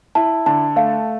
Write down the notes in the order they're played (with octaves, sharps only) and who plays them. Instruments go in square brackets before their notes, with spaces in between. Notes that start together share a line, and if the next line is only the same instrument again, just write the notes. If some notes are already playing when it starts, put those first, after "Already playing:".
[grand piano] E4 [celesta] A5
[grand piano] D3 [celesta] A5
[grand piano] A3 [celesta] F5